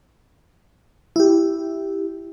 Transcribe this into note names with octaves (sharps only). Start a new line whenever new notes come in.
E4 G4